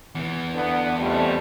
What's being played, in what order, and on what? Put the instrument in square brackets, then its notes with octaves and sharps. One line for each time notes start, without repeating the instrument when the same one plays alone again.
[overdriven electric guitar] E2 E3
[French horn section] D3 B3
F2 G3 A3